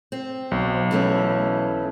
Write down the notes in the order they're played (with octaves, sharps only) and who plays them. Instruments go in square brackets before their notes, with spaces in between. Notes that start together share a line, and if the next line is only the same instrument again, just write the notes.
[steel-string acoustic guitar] C4
[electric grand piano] B1
[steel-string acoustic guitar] E3 A3 C#4